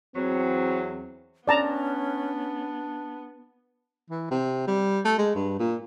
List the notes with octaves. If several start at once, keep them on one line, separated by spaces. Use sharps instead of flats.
E2 F#3 C4
B3 C#4 D4 D5 A5 A#5
E3
C3
G3
A3
G#3
G2
A#2